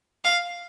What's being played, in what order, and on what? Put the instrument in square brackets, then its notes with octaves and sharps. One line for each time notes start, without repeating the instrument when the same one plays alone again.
[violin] F5